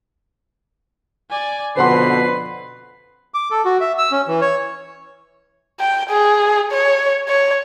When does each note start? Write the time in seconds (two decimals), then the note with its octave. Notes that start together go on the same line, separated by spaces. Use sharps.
1.30 D5 G#5
1.77 F2 B2 D3 B4 C5 F#5 C6 C7
3.34 D6
3.51 A4
3.65 F#4
3.81 E5
3.98 E6
4.12 C#4
4.28 E3
4.41 C#5
5.80 G5
6.10 G#4
6.72 C#5
7.29 C#5